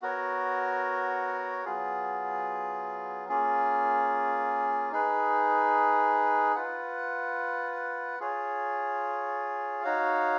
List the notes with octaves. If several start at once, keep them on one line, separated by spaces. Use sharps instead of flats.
B3 F#4 A#4 C#5
F#3 B3 F4 G#4
A#3 C#4 F4 G#4
D#4 G#4 B4
F4 B4 F#5
F4 G#4 C#5
D#4 F#4 C#5 F5